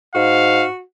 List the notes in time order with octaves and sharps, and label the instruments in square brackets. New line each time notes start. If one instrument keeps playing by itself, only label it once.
[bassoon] G#2 [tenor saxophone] F#4 [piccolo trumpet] F5